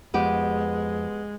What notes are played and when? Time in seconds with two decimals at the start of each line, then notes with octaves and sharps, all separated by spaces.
0.14 F2 G#3 B3 G4